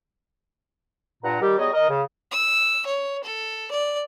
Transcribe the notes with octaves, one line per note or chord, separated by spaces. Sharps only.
G2 A#2 F#5 A#5
D#3 G3 G4
F#3 G3 B3 G#4 C#5 D#5
A#4 D#5
C#3
E6
C#5
A4
D5